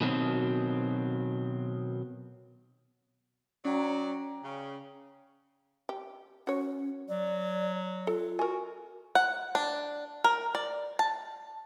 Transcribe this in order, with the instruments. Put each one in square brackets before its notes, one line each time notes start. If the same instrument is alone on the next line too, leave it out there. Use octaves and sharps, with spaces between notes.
[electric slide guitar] B2 D#3 F#3 A#3 C4
[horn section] F#3 D5 [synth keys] C#4 G5 A#5
[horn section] C#3
[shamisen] G4
[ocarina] C#4 [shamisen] F#4 C#5
[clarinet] F#3 [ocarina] D5
[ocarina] F4 [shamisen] A4
[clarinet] F#4 [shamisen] A#4 G#5
[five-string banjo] F#5
D4
A#4
D5
A5